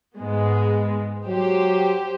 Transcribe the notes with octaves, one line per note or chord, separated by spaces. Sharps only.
G#2 G#3 B3
F#3 G4 C5